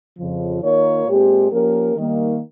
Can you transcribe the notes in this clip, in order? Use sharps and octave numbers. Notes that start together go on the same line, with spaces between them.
F2 C#3 F3
D#3 A#3 F4 A#4 C#5
A#2 G#3 C4 G4
F3 A#3 C#4 G4 A#4
D#3 G3 A#3